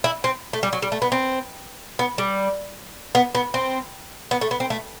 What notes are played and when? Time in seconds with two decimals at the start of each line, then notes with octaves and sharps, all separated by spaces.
0.04 E4
0.24 C4
0.53 A3
0.63 G3
0.73 F#3
0.82 G3
0.92 A3
1.02 B3
1.12 C4
1.99 B3
2.18 G3
3.15 B3
3.35 B3
3.54 C4
4.31 B3
4.41 A3
4.51 B3
4.60 C4
4.70 A3